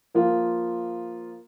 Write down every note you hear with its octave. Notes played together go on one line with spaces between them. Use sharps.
F3 A#3 F4